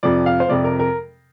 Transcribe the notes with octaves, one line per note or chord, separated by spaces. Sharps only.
F2 C3 F3 D5
F5
C5
F2 C3 F3 D5
A#4
A#4